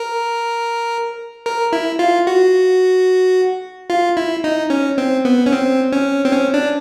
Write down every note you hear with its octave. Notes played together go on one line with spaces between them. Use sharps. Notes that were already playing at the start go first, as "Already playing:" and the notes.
Already playing: A#4
A#4
E4
F4
F#4
F4
E4
D#4
C#4
C4
B3
C#4
C4
C#4
C4
C#4
D4